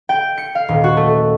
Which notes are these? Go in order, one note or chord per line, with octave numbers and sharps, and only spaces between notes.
G5
C#7
F5
D#1
F#4
A3